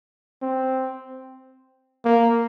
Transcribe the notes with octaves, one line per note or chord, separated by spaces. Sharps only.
C4
A#3